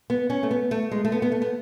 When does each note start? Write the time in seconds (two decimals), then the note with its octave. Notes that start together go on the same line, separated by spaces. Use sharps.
0.10 B3
0.30 C#4
0.43 A3
0.51 B3
0.71 A3
0.91 G#3
1.05 A3
1.12 B3
1.22 B3
1.32 A3
1.42 B3